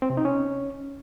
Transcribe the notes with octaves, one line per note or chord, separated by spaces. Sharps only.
C4
C3
D#4
C#4